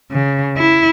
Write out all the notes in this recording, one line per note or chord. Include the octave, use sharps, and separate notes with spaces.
C#3
E4